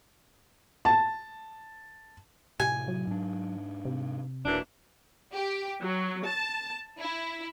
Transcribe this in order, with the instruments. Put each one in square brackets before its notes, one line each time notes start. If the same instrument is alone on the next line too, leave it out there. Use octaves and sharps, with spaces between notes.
[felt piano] A5
[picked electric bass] A2 C3 [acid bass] G4 [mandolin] G#5
[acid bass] F#3
[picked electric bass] G#2 D4
[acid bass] C3
[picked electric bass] D#1 [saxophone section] F#2 E3 D4
[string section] G4
F#3
A5
E4